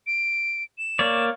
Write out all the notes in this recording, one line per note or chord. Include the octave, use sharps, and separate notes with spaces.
D7
E7
A#3 C#5 D5